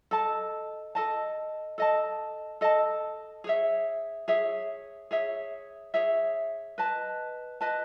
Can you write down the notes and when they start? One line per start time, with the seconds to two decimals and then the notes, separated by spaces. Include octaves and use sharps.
0.11 A4 D#5 A5
0.95 A4 D#5 A5
1.78 A4 D#5 A5
2.61 A4 D#5 A5
3.44 G#4 C#5 E5
4.28 G#4 C#5 E5
5.11 G#4 C#5 E5
5.94 G#4 C#5 E5
6.78 B4 D#5 A5
7.61 B4 D#5 A5